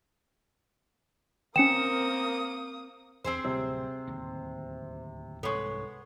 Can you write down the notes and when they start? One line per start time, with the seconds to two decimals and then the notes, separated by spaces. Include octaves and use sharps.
1.56 A#3 C4 C#4 A#4 G5 D#6 C#7 E7
3.24 E2 C4 G#4 C5
3.44 D1 C3 G3 E6
4.07 D1 D#2
5.43 C2 G#2 C3 G#3 B3 A4 C#5 C#6